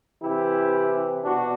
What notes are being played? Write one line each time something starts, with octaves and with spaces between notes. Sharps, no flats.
C3 E3 E4 G4
B2 D4 F#4